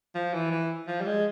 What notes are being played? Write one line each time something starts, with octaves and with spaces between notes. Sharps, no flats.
F3
E3
E3
F3
G3
G#3